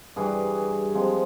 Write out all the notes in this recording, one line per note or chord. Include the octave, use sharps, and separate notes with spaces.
G2 E3 G3 G#4
C3 F3 G#3